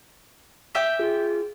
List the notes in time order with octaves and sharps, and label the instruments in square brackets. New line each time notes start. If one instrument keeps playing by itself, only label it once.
[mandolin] G4 E5 G5
[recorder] F4 [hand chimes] G#4